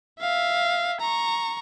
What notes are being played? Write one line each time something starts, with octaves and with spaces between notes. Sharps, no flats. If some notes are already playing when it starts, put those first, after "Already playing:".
E5 F5
A#5 C#6